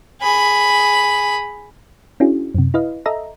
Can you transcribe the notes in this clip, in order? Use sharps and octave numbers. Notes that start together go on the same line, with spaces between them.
G#4 B5
C#4 D4 E4 F#4 G#4
F#2 C3
E4 B4 D#5 F5
A4 D#5 E5 A#5